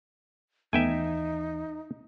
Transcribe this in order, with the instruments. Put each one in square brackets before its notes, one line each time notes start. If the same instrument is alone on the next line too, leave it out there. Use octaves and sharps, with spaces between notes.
[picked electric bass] D#2 E3 [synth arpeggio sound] A3 B3 [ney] D#4 [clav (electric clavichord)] E5 G5 G#5